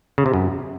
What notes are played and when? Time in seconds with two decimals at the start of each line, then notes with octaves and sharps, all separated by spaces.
0.18 C#3
0.26 C3
0.34 F#2